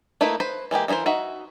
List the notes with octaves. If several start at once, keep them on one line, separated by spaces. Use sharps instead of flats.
A3 A#3 D#4 E4 B4
B4 C5
E3 G#3 A#3 G4
E3 D#4 E4 A#4 C5
D#4 F#4 E5